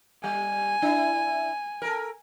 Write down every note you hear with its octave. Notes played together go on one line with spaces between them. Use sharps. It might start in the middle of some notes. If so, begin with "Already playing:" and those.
G3 G#5
D4 E4
A4 A#4